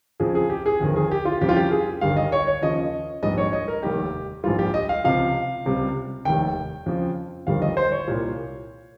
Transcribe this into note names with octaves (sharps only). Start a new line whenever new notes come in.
F2 C#3 F3 G#4
G#4
G4
G#4
G1 F2 D#3
G#4
G4
F4
F2 C#3 G3 G4
F4
G4
G#4
G1 G2 D#3 G3 F5
D#5
C#5
C#5
D#2 C#3 F3 D#5
A#1 G#2 G3 D#5
C#5
D#5
A#4
F1 D#2 D#3 G3 G4
A#1 G#2 G3 F4
G4
D#5
F5
C#2 C3 F3 F5
C#2 C3 G3
F1 D#2 D#3 G5
F2 C#3 F3
G1 F2 D#3 G3 F5
D#5
C5
C#5
C2 A#2 G3